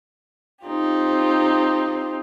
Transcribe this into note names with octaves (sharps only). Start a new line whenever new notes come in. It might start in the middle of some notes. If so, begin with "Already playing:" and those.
C4 D#4 F4 G4